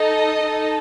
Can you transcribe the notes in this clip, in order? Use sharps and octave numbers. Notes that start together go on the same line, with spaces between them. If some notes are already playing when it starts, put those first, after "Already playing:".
Already playing: D#4 A4 D#5
D#4 A4